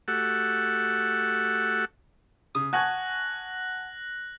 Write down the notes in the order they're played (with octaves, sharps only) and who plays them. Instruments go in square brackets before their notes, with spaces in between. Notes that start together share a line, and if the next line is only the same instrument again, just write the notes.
[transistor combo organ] A3 F#4 G4 A4 F#5
[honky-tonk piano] C#3 [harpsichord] D#6
[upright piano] F#5 G#6 [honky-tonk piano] G#5 A5 C#6 [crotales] F#6 A#6 F#7